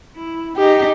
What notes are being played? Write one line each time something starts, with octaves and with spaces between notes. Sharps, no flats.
E4
D#4 G4 G#4